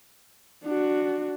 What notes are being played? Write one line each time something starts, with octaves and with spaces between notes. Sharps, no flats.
D4 F#4